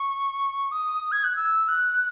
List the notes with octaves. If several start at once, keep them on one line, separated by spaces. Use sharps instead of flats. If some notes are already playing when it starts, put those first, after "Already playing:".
Already playing: C#6
D#6
G#6
F#6
E6
F#6